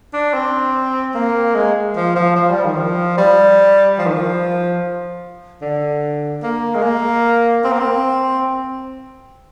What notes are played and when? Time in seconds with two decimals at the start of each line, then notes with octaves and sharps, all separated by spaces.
0.13 D4
0.34 C4
1.15 A#3
1.55 G#3
1.96 F3
2.16 F3
2.36 F3
2.50 G3
2.64 D#3
2.77 F3
3.18 G3
3.99 F3
4.06 D#3
4.14 F3
5.62 D3
6.43 A#3
6.75 G#3
6.83 A#3
7.64 C4
7.72 A#3
7.80 C4